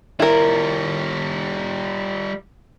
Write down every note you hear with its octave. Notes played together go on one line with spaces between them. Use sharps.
G3 E4 F4 A#4